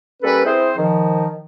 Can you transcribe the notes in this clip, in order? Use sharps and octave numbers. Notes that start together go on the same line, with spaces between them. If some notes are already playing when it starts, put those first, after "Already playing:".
G3 A#3 C#4 A4 B4
C4 E4 G#4 C5
D#3 F3